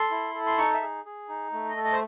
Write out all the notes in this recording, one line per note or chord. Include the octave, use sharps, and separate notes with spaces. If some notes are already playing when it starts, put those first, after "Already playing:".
Already playing: A4 C6
E4
A4
C6
D#4 C#6
E5
G#4
G#4
D#4
A3
D#5
A4
D#5
C5